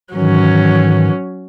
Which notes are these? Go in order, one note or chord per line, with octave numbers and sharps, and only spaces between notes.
G#2 D#3 E3 F#3 C#4